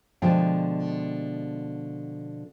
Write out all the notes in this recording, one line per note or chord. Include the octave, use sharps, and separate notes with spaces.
B2 D3 F3 G#3 F4 G5